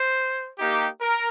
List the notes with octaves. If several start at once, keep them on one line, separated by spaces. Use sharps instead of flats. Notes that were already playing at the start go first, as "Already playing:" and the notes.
Already playing: C5
A#3 D#4 G4
A#4